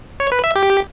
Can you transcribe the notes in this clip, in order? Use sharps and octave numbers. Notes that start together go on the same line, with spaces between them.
C#5
B4
E5
G4